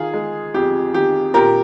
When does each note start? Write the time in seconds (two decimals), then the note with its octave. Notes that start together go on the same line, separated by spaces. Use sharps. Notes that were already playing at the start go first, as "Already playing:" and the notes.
Already playing: D#3 F4 G#4
0.14 G#3
0.54 F2 G4
0.94 D#3 G4
1.34 A#2 G4 A#4